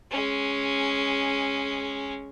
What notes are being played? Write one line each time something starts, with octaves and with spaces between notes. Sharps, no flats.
G#3 C#4